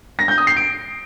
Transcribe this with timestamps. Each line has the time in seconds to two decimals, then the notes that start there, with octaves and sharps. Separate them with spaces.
0.19 A#6
0.28 G6
0.38 D#6
0.47 C7
0.57 D7